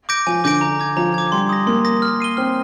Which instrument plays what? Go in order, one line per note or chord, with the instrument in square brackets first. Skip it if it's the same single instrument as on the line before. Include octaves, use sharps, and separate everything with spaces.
[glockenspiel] D6 G6 A#6 D7
[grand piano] F3 [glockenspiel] G#5
[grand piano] D3 [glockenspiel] D6 G6 A#6 D7
[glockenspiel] A#5
D6 G#6
[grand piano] F3 [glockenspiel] A#5
[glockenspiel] D6 G#6
[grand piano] G3 [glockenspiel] C6
[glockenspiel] D#6 A#6
[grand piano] A#3 [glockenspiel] C6
[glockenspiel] D#6 A#6
F6
C7 D#7 G7
[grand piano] C4 [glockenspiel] F6